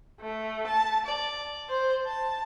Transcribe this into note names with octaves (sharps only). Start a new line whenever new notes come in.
A3
A5
D5
C5
A5